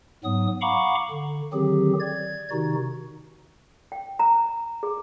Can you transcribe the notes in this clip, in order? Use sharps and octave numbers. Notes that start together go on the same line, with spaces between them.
G#2 F#3 B3 D#6
F5 F#5 A#5 B5 C#6 D6
D3
D3 D#3 F#3 C4 G4 G#4
D5 G#6
C3 D#3 D#4 F#4
G5
A#5
G#4